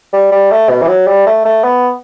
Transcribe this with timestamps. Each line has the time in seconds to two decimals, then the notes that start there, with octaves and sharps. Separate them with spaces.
0.13 G3
0.32 G3
0.51 A3
0.69 B2
0.82 E3
0.88 F#3
1.07 G3
1.27 A3
1.45 A3
1.64 B3